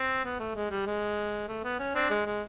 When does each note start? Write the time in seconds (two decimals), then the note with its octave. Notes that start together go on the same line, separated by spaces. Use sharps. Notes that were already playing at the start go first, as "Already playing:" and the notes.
Already playing: C4
0.24 B3
0.39 A3
0.56 G#3
0.70 G3
0.86 G#3
1.48 A3
1.64 B3
1.79 C#4
1.95 C4 D4
2.10 G#3
2.26 G#3